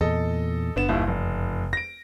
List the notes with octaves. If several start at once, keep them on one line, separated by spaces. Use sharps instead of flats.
E2 A#2 A4 D#5
F#1 D3 B3 E7
D#1 D#2 E4
F1
A#6 D7